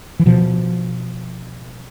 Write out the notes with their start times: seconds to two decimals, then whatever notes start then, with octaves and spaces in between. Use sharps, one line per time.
0.20 E3
0.26 B2 F3